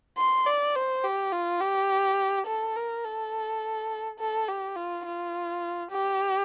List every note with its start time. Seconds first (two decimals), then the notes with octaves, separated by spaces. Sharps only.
0.17 C6
0.46 D5
0.75 C5
1.04 G4
1.32 F4
1.61 G4
2.47 A4
2.76 A#4
3.05 A4
4.19 A4
4.48 G4
4.76 F4
5.05 F4
5.91 G4